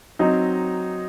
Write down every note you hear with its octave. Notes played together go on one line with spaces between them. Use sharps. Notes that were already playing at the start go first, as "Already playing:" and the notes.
F#3 C4 D#4